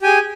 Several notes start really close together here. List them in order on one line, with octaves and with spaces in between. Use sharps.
G4 G#5 G#4